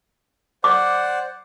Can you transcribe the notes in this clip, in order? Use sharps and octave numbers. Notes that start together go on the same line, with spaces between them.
C5 D5 F#5 D6